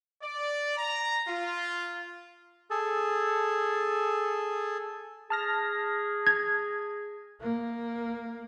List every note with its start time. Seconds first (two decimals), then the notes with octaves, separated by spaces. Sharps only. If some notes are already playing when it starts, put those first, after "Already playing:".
0.22 D5
0.78 A#5
1.26 F4
2.70 G#4 A4
5.30 G#4 A5 F6 A#6
6.27 G#6
7.41 A#3